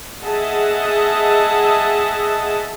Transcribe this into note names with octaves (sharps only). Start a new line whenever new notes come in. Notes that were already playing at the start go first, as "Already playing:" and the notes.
G#4 D#5 E5 F#5 A5